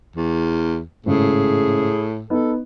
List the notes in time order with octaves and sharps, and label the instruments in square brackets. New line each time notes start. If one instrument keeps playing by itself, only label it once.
[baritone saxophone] E2
[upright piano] G#1 C#3 [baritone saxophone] A2 [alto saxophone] G#4
[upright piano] B3 D#4 [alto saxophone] A4